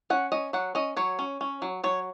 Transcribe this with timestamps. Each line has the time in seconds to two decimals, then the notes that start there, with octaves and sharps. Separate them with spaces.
0.10 C#4 F#5
0.32 C#4 D#5
0.53 F#3 F#5
0.75 C#4 D#5
0.96 F#3 C#5
1.19 C#4
1.41 C#4
1.62 F#3
1.84 F#3 C#5